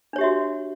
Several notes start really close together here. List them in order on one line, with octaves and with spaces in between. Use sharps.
D4 C#5 G4 E5 F#4